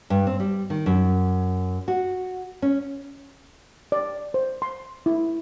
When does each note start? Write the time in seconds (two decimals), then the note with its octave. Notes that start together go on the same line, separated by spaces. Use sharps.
0.10 G2
0.27 C4
0.40 G3
0.70 D#3
0.86 F#2
1.88 F#4
2.62 C#4
3.92 D5
4.34 C5
4.62 C6
5.06 E4